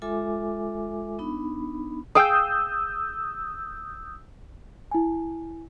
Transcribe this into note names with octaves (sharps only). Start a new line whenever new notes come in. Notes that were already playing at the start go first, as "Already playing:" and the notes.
G#3 F4 A4 E5 G#5 D6
B3 D4 D#4 B5
G#4 F5 G5 D#6 E6 G6
E4 G#5